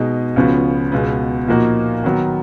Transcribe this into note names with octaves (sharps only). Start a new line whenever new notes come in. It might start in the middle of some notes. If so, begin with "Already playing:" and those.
Already playing: B2 G#3 D#4
C#2 C#3 F3 B3 F#4
C#2 B2 G#3 B3
A#2 F3 A#3 D#4 F#4
D#3 F#3 B3